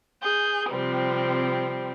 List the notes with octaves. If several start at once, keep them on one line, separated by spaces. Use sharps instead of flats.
G#4 G6
C3 F3 G3 C4